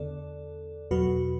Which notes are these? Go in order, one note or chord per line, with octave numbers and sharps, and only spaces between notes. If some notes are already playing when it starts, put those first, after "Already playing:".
Already playing: E2 D3 B3 A4 D5
E2 B2 F#3 F#4 B4